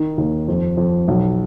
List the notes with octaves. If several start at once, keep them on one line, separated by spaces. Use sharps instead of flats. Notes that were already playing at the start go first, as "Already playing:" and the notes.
Already playing: D#3
D#2
F2
F2
B1